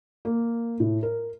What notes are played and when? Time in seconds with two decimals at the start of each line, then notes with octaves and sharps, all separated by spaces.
0.25 A#3
0.80 A2
1.03 A#4